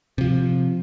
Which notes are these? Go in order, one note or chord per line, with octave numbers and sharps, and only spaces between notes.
C3 F3